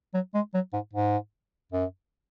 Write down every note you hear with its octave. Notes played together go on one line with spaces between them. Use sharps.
F#3
G#3
F#3
G#2
G#2
F#2